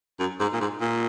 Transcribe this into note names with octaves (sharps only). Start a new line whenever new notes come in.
F#2
G#2
A#2
G#2
A#2